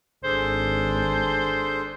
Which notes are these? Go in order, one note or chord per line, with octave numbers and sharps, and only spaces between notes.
G#1 D4 G#4 A4 C5